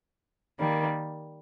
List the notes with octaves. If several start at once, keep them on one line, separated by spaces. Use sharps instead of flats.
D#3 G3 A#3